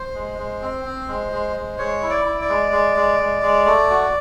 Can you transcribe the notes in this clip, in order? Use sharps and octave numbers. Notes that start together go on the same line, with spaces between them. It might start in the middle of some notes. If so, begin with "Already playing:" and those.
Already playing: C5
G#3
G#3
C4
C4
G#3
G#3
G#3
G#3 C#5
E4
D5
E4
D5
G#3
G#3
G#3
G#3
G#3
A3
F#4